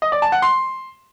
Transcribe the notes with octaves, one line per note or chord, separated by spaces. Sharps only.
D#5
D5
A5
F#5
C6